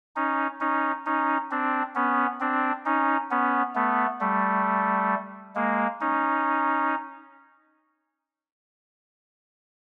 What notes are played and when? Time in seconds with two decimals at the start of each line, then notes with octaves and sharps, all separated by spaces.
0.16 C#4 D#4
0.60 C#4 D#4
1.06 C#4 D#4
1.51 C4 D4
1.95 B3 C#4
2.40 C4 D4
2.85 C#4 D#4
3.31 B3 C#4
3.75 A3 B3
4.20 G3 A3
5.55 G#3 A#3
6.01 C#4 D#4